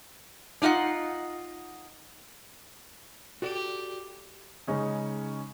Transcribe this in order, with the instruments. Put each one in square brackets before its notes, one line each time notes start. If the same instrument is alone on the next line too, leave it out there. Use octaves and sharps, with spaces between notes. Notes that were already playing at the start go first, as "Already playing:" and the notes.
[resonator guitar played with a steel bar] D4 D#4 F4 D#5 F#5
[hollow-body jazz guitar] F#4 A4 D5 [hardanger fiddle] G4
[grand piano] C#3 G#3 C#4 D#4